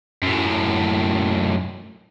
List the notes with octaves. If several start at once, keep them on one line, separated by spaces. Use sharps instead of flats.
F#2 A2